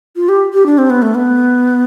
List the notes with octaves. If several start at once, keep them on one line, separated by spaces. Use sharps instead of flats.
F4
G4
G4
D4
C4
B3
A3
B3